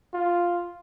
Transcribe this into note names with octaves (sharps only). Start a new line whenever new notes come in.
F4